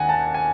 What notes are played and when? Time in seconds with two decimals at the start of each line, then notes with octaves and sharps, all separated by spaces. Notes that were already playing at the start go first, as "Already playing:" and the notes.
Already playing: D#2 F#5 G#5
0.09 A5
0.34 G#5